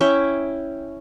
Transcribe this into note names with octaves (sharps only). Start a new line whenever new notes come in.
C#4 E4 E5 G5